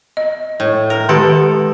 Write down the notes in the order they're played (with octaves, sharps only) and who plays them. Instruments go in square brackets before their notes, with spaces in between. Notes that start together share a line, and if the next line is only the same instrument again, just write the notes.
[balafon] D#5
[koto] A2
A#4
[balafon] D#3 G#3 G4 [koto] B3 A4